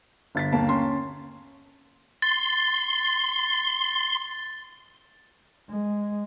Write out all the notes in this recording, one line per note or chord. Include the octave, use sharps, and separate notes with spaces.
G1 A6 B6
D#2 A#3 A5
C#4 C6
C6 A6
G#3